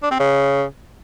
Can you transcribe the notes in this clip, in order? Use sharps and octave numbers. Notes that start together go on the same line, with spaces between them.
D4
C4
C#3